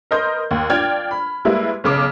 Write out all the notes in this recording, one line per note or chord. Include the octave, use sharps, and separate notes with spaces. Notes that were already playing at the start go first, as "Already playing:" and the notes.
A#4 B4 D#5 C6 G6
D#2
D4 F4 D5 G5 F6 G#6
B5
G3 G#3 A#3 E4 B4
B1 C#3 D6